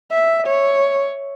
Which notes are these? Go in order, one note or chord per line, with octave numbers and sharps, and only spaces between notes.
E5
C#5